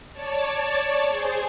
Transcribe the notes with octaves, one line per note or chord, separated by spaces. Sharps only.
C#5 D5 A5
G#4 C5 G#5